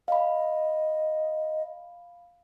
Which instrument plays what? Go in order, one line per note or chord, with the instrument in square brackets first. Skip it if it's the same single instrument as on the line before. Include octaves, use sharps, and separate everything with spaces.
[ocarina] D#5 [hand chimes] F5 B5